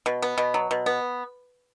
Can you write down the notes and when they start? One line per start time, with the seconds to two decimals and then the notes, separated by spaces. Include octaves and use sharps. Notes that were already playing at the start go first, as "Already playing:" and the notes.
0.06 B2
0.22 B3
0.38 B2
0.54 F#3
0.71 B2
0.86 B3